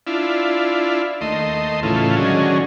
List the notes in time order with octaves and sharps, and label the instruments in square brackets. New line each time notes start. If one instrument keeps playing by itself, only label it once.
[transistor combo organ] D4 E4 F4
D#2 A3 D#5 C6
A2 C#3 E3 A3 F4
D3 D#3 F#3 G#3 C#4